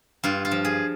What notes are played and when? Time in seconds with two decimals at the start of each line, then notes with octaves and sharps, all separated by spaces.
0.24 G2 F4
0.45 F4
0.51 F3
0.65 G#4